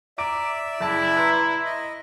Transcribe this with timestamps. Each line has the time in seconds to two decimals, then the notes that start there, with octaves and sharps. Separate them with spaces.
0.18 D5 E5 A#5 D6 D7
0.80 F#1 E4 A5
1.17 B4 A#5 C6
1.65 D#5